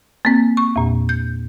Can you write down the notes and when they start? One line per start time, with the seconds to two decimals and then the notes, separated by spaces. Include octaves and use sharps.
0.25 A#3 C4
0.57 C#6
0.76 E2 A#2
1.09 G6